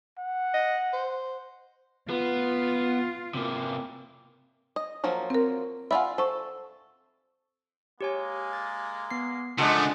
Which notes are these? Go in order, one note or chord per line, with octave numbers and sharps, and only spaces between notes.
F#5
D#5
C5
B3 F4
C3 A#3
D#5
F3 F#3 A#3
C4 A#4
F4 D5 E5 F#5 G#5 B5
A4 C5 C#6
G#3 A#3 G4 C#5 G#5
A6
B3 C7
C#3 F3 G#3 A3 D4 A4 F#5 D#6